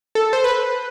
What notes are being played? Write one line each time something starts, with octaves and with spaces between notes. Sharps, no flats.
A4
C5
B4